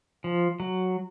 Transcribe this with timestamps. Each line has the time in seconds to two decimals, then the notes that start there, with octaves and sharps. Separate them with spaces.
0.24 F3
0.60 F#3